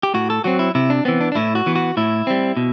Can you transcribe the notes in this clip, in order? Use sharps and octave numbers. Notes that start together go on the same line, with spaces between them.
G4
A2 F#4
A4
F#3 C4 F#4
E4
C3 E4
D4
E3 B3 C4
D4
D4
A2 E4
F#4
E3 B3
F#4
A2 E4
G3 C4
B2